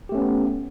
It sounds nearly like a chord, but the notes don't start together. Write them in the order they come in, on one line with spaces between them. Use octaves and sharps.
G4 A3 C#4 B3